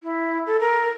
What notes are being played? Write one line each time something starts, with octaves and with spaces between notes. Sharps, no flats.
E4
A4
A#4